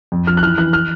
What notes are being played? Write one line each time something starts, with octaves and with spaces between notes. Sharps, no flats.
F2
F3 F6
F#6
E3 F6
E3 F#6
F6